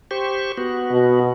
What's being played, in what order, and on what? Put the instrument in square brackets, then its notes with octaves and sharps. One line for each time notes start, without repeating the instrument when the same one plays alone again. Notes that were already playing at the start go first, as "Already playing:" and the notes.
[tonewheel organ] G4 C5 C#6
B3 F#4
[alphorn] B2